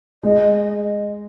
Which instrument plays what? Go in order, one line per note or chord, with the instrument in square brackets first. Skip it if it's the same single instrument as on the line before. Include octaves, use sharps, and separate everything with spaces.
[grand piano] G#3 [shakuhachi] D#5